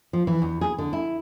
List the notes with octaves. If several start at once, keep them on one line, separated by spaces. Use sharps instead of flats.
F3
E3
E2
G#4
D3
E4